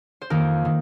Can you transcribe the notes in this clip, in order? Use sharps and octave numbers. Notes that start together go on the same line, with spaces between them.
C5
F2 D#3 A#3 A#4
D#3